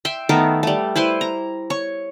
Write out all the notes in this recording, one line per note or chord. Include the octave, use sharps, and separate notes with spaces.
E5 G5 C6
D#3 A3 B3 A#4
G3 A3
E4 B4 C5 C6
A#5
C#5 C#6